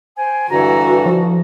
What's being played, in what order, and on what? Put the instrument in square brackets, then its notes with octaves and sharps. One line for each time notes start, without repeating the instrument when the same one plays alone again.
[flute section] C5 G5 G#5
[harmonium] G2 D3 E3 [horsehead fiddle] F#4 [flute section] A4 A#5
[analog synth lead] F3